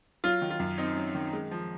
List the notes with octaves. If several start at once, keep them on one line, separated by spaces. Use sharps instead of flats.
F#3 F4
D#3
F4
F#2
C4 D#4
F#3
D#3
G#3
F3